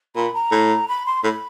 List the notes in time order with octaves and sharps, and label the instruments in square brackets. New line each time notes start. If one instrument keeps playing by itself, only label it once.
[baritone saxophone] A#2 [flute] B5
[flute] A#5
[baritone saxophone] A2
[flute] B5
C6
[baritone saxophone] A2 [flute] B5